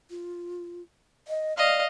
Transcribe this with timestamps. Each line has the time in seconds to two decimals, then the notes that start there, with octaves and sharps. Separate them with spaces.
0.10 F4
1.28 D#5
1.58 D5 D#5 F5